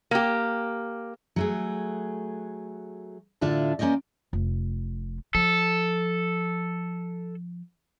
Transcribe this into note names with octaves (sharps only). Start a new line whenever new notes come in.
A#3 G4
F#3 A3 G#4
A2 D3 D4 F4 E5 A5
A#3 C#4 C5 D5 D#5
F1
F3 A4